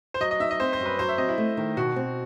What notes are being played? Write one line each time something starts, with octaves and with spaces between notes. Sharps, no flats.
C5
F#3 D#5
D#5
D#4 E5
D#5
C4 C5
C5
F#2
B4
F#3 C5
E5
C4 D#5
E4
A3
D#3
B2 F#4
C4